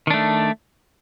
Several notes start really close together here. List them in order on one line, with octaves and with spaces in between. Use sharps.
D#3 D4 A3